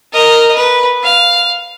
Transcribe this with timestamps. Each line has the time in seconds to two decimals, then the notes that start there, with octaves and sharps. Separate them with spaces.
0.13 A#4 D#5
0.55 B4
1.03 F5